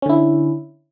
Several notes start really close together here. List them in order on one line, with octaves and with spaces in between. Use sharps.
C#4 D3 E4